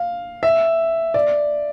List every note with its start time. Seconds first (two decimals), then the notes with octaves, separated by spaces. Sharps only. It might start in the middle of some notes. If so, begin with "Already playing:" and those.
Already playing: F5
0.43 E5
1.14 D5